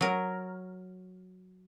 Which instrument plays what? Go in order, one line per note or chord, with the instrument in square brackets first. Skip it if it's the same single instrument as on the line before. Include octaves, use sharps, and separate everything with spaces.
[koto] F#3 A#4